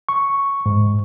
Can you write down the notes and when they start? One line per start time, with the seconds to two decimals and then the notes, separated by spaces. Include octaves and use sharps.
0.09 C#6
0.66 G#2